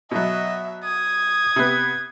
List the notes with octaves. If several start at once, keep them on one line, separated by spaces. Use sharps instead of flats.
B2 F#3 D#5 E5
D#6 G#6
C3 B3